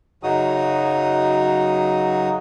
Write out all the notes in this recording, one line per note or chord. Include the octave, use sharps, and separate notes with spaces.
F#2 C#3 F#3 D#4 F#4 D#6